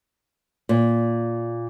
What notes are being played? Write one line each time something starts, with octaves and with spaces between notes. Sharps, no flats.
A#2